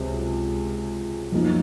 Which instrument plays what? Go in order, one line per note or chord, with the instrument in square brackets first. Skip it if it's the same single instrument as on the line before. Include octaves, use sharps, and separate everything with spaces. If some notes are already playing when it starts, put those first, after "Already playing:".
Already playing: [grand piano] C#2 C3 F#3 C4
F#2 F3 A#3 D#4